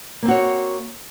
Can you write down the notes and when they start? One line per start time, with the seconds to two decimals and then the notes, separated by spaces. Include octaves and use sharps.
0.23 A#3
0.25 C4
0.28 F#4
0.31 C#5